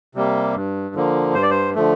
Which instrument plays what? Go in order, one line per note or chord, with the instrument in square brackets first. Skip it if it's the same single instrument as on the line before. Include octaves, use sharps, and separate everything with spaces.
[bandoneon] C3 G3 A#3
G2
D3 F3 A#3
G2 C5
D5
C5
D3 F3 A3